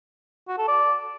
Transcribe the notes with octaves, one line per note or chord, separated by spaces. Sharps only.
F#4
A4
D5